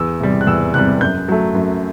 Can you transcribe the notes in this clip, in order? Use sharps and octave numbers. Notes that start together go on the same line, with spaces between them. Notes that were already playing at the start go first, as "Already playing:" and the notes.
Already playing: E2 E6
C3 G3
F#6
E2 E6
C3 G3 F#6
F#2 G6
F#3 A3
F#2